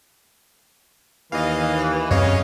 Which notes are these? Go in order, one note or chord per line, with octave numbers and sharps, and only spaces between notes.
D#2 E3 D#5 F5
F#2 C#3 C4 C#5 D#5 F5